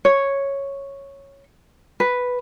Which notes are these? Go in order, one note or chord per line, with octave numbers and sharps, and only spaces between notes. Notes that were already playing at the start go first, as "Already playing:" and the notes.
C#5
B4